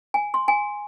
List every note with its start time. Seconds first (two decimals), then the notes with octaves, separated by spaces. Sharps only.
0.14 G#5
0.34 C6
0.48 G#5